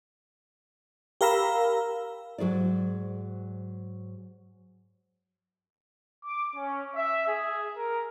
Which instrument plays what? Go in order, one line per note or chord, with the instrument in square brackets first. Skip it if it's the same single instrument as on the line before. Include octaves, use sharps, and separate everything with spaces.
[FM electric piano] G4 A#4 F5 A#5 B5 E6
[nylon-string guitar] G#2 F#3 G#4 C5 D5
[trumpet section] D6
C#4
E5
G#4
A#4